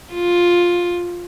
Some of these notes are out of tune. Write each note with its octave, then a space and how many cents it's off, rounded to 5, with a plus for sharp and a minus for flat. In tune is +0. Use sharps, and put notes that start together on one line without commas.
F4 +5